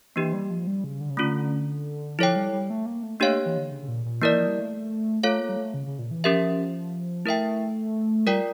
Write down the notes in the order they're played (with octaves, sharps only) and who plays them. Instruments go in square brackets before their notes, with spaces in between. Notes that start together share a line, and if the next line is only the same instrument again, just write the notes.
[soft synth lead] E3 [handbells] A#3 D4 G4
[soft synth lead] G3
F3
G3
C#3
D3
C#3
[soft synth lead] D3 [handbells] A3 C#4 F4
[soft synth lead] F3 [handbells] E4 A4 C#5 G5
[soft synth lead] G3
G3
A3
A#3
A3
[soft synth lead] A3 [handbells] A#3 D4 G4 C#5 F5
[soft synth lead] E3
D3
C#3
C#3
A#2
A#2
[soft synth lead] E3 [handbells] A#3 E4 A#4 D5
[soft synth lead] F3
G3
A3
[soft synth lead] A3 [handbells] F4 A4 C#5 F5
[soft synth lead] A#3
G3
A3
C#3
C#3
A#2
E3
[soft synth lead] F3 [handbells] C#4 G4 A#4 E5
[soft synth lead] A3 [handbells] E4 A#4 E5 G5
[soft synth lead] G3 [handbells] F4 A#4 D5 G5